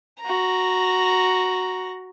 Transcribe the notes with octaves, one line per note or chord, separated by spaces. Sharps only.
F#4 A#5